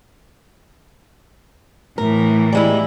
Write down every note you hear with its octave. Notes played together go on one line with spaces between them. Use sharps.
A2 E3 A#4
G3 G#3 E4